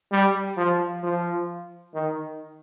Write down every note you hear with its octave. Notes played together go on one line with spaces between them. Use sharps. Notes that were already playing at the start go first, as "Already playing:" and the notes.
G3
F3
F3
D#3